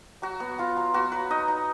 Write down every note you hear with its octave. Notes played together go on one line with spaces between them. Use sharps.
F#3 F#4
B3
B3 F4
F#3
B3 F#4
F#3 B4
D#4 D#5
D#4